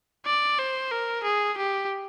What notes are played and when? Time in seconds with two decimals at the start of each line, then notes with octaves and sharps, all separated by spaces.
0.26 D5
0.59 C5
0.92 A#4
1.24 G#4
1.58 G4